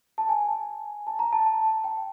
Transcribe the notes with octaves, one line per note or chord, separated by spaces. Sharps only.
A5
G#5
A5
A#5
A5
G5